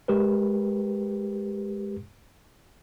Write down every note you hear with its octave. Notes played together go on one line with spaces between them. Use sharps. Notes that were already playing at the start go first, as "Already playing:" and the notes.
G#3 G4 A#4 B4